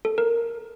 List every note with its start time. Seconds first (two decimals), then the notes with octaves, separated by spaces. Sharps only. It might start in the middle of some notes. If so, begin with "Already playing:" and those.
0.05 A4
0.18 A#4